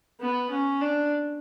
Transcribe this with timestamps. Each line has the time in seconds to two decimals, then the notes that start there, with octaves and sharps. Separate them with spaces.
0.20 B3
0.50 C#4
0.81 D4